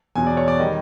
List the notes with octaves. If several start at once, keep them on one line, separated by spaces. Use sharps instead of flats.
E2 B2 F#3 G#5
D5
C#5
D5
D#3 G3 D#5